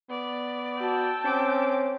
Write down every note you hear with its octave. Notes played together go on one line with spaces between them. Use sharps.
B3 D5
F#4 G5 A5 E6
C4 C#4 D6